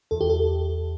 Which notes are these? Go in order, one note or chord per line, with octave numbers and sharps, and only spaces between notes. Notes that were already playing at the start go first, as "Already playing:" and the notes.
E2 A4
G4
A4